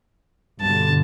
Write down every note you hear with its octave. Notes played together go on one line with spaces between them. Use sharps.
G2 B2 D3 A5